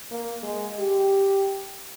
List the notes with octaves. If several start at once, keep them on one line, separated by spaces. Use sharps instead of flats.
A#3
G#3
G4